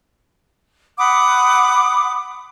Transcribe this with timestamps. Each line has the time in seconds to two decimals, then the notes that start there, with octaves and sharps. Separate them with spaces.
0.98 F#5 B5 D6 D#6